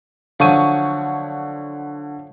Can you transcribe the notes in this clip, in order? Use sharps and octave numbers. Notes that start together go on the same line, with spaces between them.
D3 F3 F#3 C#6 D#7